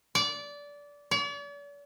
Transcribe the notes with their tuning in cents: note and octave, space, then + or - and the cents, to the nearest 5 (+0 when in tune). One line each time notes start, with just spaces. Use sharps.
D5 -20
D5 -45